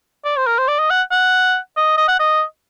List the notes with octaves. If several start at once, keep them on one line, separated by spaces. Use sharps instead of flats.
D5
C5
A#4
C5
D5
D#5
F#5
F#5
D#5
D#5
F#5
D#5